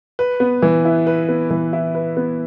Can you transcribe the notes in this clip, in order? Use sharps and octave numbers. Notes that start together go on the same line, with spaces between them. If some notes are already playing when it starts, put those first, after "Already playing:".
B4
B3
E3
E4
B4
B3
E3
E4
B4
B3